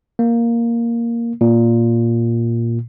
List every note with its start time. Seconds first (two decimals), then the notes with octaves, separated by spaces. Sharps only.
0.19 A#3
1.41 A#2